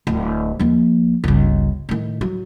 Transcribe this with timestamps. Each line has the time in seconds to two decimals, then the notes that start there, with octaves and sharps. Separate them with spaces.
0.07 D1
0.59 D#2 F3
1.24 G1 C#2
1.89 A2 D#3
2.21 F#3